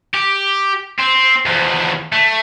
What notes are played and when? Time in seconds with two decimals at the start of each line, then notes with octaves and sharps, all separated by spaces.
0.14 G4
0.99 C4
1.46 E2 F3
2.12 A3